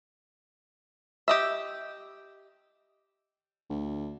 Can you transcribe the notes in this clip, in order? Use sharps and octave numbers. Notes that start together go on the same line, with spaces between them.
G4 D#5 E5
D2